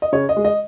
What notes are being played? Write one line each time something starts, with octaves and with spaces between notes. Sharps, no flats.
D#5
C#3 C#5
D#5
G#3
D#5